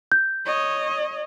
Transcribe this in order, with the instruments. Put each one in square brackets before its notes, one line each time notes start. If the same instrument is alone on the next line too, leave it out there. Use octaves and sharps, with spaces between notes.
[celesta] G6
[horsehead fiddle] C#5 D#5